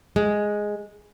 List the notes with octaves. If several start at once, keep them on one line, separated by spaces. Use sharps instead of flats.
G#3